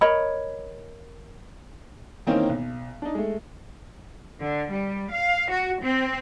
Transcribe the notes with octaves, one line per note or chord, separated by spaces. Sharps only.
A#4 C#5 D#5 B5
D#3 E3 A#3 C4 C#4 D#4
B1
D4 D#4
G#3 A3
D3
G3
F5
F#4
C4